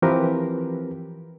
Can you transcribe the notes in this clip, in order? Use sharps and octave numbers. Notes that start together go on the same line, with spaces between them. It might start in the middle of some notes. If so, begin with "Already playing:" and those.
E3 F3 C4 G4 A#4 B4